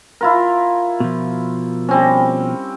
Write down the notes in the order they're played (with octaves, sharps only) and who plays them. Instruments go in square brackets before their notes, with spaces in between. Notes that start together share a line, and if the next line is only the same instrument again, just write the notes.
[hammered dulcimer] E4 F4 A#4
[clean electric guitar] B2 F3
[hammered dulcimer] G3 C4 C#4